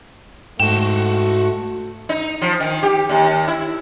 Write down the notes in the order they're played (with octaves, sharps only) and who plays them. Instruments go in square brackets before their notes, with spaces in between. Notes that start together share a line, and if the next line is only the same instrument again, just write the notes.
[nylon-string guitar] G#2 [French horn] A3 [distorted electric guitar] F#4 G5 [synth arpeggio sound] E7
[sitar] D#4
F3
D#3
G4
D#2
E4